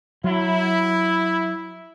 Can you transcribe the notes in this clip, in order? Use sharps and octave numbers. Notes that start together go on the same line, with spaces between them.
F#3 E4